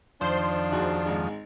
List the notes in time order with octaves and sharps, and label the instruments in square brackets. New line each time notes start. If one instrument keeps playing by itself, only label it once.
[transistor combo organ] F2 D#3 F3 [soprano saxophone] D4 [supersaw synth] C5 C6
[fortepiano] D#2 F#4 G#4
G#1 G#3